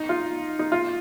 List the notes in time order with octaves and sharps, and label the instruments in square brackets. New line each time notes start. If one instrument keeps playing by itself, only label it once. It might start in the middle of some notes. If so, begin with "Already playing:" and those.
Already playing: [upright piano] D#4
F4
D#4
F4